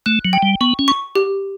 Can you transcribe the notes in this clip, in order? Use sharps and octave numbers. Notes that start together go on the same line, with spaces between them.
A3 F#6
F#3
G5
G3
B3 C#6
C#4
C#6
G4